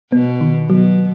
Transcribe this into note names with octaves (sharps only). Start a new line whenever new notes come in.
B2 B3
D#3
B2 F#3